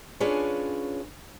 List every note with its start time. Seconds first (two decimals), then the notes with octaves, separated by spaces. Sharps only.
0.20 C#4 D4 F4 G#4 B4 C#5